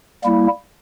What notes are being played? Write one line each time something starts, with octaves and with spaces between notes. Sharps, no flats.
G3 A#3 E4